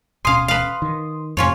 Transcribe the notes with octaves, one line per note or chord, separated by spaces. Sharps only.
D1 B2 C#4 F5 G#5 C6 D#6
B4 F5
D#3
F2 A2 C3 C#4 F4 C#5